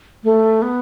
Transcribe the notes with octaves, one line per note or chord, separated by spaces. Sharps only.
A3
B3